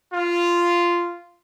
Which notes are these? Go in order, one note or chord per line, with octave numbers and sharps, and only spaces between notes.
F4